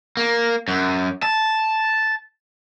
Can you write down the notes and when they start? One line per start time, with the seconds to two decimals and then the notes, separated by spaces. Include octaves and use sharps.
0.17 A#3
0.68 F#2
1.23 A5